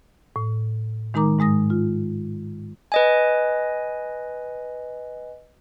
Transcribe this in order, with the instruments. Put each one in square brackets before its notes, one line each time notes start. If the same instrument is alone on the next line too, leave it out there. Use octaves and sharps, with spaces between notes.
[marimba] A2
D#3 G#3 D#4 A#4 A#5 D6
G#2 G#3 D#6 A#6
F4
[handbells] B4 D#5 G#5